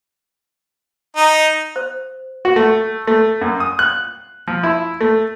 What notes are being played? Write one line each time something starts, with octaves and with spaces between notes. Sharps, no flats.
D#4
C5
F#4
A3
A3
F#2
D#6
F#6
F3
E4
A3